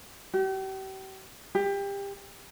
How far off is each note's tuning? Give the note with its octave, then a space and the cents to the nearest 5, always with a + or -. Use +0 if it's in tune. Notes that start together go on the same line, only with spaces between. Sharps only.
G4 -40
G4 +25